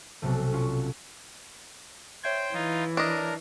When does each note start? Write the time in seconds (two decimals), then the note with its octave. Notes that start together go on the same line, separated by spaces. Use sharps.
0.22 B1 C3 A3
0.52 C#4 F4
2.24 C5 C#5 E5 G5 G#6
2.54 E3 D#4 F4
2.97 D4 A#4 D#5